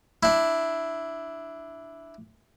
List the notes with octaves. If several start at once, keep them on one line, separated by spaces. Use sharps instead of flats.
D4 E4